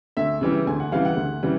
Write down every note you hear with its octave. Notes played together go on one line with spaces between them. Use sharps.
D2 E5
C#3 E3 G3
D2 G#5
F#5
C#3 E3 G3 F5
F#5
D2
C#3 E3 G3